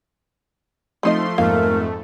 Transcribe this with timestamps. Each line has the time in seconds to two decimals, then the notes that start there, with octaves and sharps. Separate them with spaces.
1.03 F3 A3 C4 D#4 D#5 C6
1.38 F2 G#2 A3 A#3 D#4 A#4 F5